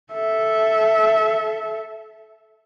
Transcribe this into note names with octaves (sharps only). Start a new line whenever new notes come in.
A4 E5